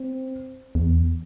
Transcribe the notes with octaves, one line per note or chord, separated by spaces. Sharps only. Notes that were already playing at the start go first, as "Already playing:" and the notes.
Already playing: C4
E2